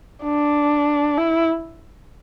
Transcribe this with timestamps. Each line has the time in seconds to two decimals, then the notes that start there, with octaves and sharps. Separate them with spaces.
0.23 D4
1.17 E4